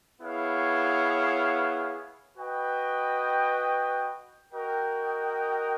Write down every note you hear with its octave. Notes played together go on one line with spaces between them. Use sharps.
B3 E4 G#4 C#5 F5
F#4 B4 D#5 G5
F#4 A#4 D#5 G5